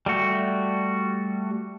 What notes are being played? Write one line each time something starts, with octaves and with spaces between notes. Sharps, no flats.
G3 A3 F#4